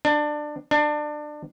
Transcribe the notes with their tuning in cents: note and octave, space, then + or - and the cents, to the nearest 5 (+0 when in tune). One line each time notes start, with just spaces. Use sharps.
D4 +20
D4 +25